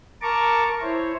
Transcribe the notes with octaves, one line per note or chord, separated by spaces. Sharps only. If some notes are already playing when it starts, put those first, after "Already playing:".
A#4 A5 A#5 C#6 D6
E4 C5 C#5